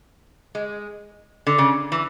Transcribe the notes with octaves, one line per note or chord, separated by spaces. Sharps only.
G#3
D3
C#3
E3